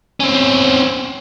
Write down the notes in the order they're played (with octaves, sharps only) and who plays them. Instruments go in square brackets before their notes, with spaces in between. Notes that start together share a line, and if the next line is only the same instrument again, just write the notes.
[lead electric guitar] C4 C#4